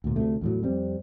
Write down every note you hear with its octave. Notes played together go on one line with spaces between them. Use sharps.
D2 A#2
D2 C3 A3
E2 A2 F#3
F2 G3 C4